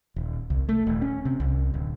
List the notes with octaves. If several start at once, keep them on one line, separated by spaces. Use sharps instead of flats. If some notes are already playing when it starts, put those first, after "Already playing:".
D#1
C2
A3
D#1
C#4
C3
C2
D1